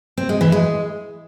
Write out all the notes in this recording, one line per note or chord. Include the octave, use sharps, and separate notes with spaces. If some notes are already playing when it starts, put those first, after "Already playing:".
C4
G#3
E3
G#3